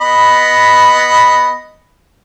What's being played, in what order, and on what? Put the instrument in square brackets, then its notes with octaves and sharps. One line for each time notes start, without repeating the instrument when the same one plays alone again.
[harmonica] B3 D#5 B5